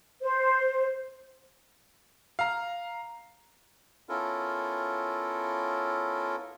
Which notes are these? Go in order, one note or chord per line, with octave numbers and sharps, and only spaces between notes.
C5
F5 A#5
B3 C#4 E4 F4 A4 A#4